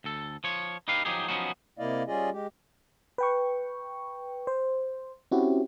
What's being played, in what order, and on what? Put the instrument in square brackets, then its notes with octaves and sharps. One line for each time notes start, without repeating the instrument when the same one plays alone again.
[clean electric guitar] D2 A4
F3 C#5
D#4 G4 B4 F5
F3 F#3 D#4 G4 G#4
F3 F#3 B3 C#4 D#4 F#4
[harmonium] C3 A#3 E4 D5 D#5 F5
G3 C#4 F4 G#4 D5 D#5
G#3 G4
[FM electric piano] B4 G5 C#6
C5
C4 C#4 E4 F#4 G4